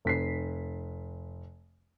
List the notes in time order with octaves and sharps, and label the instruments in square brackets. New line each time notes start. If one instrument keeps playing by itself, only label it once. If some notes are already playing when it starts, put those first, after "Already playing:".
[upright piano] F1 B6 C7